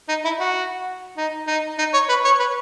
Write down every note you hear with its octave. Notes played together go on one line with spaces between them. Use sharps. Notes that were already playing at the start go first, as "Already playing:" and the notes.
D#4
E4
F#4
D#4
D#4
D#4
C#5
B4
C#5
B4